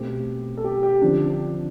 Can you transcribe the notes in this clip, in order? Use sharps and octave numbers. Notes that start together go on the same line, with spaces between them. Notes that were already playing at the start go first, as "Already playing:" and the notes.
Already playing: B2 A3 C4 G4
A4
G4
G4
D3 F3 C4 D4
D4